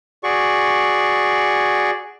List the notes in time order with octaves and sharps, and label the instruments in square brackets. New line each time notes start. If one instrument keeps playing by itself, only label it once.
[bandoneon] F#4 G#4 D5 C#6